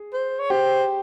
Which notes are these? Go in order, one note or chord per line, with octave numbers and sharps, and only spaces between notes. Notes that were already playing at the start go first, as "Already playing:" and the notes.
Already playing: G#4
C5
C#5
G4 C5